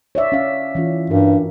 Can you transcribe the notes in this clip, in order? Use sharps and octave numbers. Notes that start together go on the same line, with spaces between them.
C#5 D5 E5
C#4 F5
E3 C#4 F4
G2 F#4 A#4